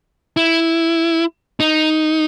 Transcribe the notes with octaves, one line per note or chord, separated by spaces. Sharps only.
E4
D#4